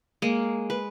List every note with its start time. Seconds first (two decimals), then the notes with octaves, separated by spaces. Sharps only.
0.22 G#3 A#3
0.70 B4